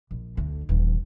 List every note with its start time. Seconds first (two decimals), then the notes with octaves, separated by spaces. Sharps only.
0.11 A#1
0.37 D2 D3
0.69 D#1 E3